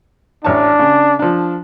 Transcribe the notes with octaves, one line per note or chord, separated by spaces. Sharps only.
A1 D4 C#5 A5
C#3
F3 D4